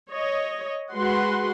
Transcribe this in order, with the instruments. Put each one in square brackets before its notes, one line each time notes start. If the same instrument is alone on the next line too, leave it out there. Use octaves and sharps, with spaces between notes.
[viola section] C#5 D#5
G#3 F#4 B4 F#5 C6